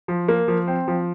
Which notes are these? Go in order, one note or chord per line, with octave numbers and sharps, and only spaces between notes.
F3
A#3
F3
C4
F3